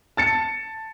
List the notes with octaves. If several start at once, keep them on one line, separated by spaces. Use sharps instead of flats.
A5 A6 C#7